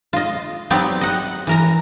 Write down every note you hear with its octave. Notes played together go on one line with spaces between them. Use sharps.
F4 D#5
F#3 B3 C4 D#4 G4 D5
D#5 F#5
E3 A#4 A#5